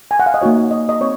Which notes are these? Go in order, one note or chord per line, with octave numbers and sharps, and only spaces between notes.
G#5
F#5
F5
D#5
A#3 D#4 F#4 C#5
D#5
D#5
C4 C#5